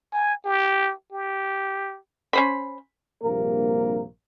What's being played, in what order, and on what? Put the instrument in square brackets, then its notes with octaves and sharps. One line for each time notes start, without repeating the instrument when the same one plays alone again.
[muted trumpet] G#5
G4
G4
[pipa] C#4 C5 B5
[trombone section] A#1 G2 C3 A#3 A#4